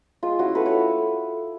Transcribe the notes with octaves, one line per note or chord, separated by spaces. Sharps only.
G#3 F4
C#4 E4 F#4
A3 A4 B4
B4 C#5